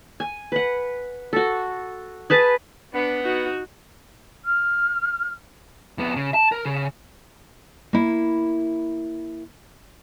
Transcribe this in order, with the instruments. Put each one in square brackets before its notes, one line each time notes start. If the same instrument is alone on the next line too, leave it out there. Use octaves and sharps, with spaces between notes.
[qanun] G#5
B4 F#5
F#4 A4
G#4 B4 A5
[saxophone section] B3 [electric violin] D4
[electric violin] D#4 F#4
[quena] F6
[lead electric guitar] F2 B3
C#3
A5
A#4
C#3
[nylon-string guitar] A#3 E4